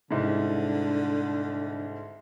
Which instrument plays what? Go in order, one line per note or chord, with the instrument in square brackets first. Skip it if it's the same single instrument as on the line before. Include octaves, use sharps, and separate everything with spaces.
[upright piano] C2 G#2 [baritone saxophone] D3